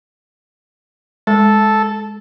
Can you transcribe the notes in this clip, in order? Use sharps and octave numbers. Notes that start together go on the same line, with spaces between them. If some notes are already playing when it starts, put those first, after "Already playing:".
G#3 A4